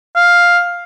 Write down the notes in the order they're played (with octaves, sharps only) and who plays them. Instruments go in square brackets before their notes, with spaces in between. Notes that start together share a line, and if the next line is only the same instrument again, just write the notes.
[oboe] F5